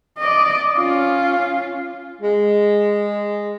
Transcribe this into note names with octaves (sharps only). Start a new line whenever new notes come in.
D5 D#5
C#4 F4
G#3